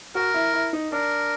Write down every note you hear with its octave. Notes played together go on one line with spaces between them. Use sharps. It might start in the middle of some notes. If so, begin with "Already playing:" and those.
F#4 A#4
E4
E4
D#4
D4 A#4